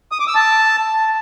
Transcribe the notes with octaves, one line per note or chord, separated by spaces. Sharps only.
D#6
D6
E6
A5